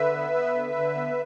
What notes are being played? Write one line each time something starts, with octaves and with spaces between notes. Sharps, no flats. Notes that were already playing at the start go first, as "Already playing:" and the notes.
Already playing: D3 B4 E5
B3
B3
D3
D3
B3